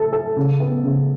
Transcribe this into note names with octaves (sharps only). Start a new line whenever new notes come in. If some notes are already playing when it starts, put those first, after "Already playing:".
Already playing: A4
A4
C#3
B3
C#3